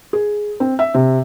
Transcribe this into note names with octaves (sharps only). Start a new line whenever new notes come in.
G#4
C4
E5
C3